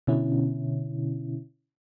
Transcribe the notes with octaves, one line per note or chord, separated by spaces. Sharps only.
B2 D3 C#4 E4